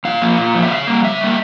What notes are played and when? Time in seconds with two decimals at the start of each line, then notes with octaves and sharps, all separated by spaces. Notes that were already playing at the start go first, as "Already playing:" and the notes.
0.05 A#2 F5
0.22 F3 A#3
0.39 A#2
0.55 F3 A#3
0.63 E5
0.71 C#3 F5
0.87 G3 A#3
1.04 C#3 E5
1.21 G3 A#3